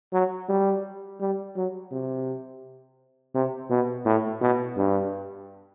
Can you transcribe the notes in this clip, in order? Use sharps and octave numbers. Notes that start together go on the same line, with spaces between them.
F#3
G3
G3
F#3
C3
C3
B2
A2
B2
G2